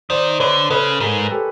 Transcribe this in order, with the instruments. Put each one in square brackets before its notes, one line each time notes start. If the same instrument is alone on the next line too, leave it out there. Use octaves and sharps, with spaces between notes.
[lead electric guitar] D#3 [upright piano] C5 D5
[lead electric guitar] D3 [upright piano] B4 C#5
[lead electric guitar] C#3 [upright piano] A4 B4
[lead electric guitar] G#2 [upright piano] G#4 A#4
[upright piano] G4 A4